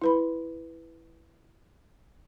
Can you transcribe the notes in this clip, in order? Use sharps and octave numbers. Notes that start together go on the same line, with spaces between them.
E4 B4 B5